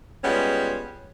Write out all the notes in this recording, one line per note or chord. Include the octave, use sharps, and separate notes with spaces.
G3 G#3 B3 C#4 F4